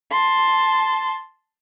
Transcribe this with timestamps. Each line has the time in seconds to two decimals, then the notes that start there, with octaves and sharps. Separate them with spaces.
0.12 A5 C6